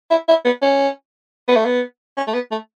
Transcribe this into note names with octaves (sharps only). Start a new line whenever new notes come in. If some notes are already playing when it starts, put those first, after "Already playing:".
E4
E4
B3
C#4
B3
A3
B3
C#4
A3
B3
A3